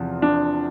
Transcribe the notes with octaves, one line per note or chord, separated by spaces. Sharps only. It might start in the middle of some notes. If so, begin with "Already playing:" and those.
Already playing: E2 C3 F3
D4